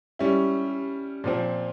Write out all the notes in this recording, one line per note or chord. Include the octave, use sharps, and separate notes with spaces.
G3 C#4 E4
A#2 F3 C4